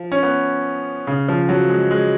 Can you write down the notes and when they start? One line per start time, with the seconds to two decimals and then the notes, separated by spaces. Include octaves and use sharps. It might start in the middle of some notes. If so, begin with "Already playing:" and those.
Already playing: F3
0.12 C#4
0.23 B3
1.07 C#3
1.29 F3
1.49 F#3
1.70 G#3
1.91 G#3